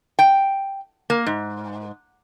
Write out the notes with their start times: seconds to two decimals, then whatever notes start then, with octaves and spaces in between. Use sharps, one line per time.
0.19 G5
1.10 A#3
1.26 G#2